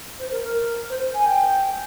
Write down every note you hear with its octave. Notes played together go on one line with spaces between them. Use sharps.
C5
A#4
A#4
C5
G#5
G5